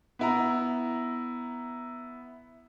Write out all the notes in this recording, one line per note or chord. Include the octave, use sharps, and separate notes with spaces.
B3 E4 A#5